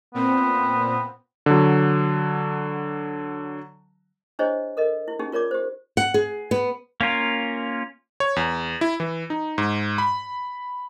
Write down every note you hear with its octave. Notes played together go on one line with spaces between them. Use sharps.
A#2 B3 C4
D3 F#3
D4 E4 G#4 C5 C#5 D#5
A4 A#4 D#5
E4
C#4 D#4 G4 G#4
F4 A#4 C#5 D5 D6
G4 C5
F#5
G#4
B3
A#3 C#4 F4 A#4
C#5
E2
E4
E3
D#4
G#2
B5